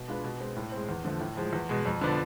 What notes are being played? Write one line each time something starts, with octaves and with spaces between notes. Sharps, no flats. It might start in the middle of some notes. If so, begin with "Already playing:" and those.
Already playing: B2
G#3 D4 F4 B4
B2
G#3 C4
A2
G#3 C4
E2
D3 F3 A3
A2
F3 G#3
E2
B2 G#3
F2
D3 F3 B3 D4